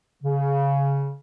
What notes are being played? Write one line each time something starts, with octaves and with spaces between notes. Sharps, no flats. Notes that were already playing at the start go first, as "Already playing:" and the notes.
C#3